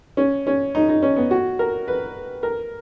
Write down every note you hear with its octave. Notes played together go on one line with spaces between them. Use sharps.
C#4
C#4
D#4
D#4
C#4
B3
F#4
A#4
B4
A#4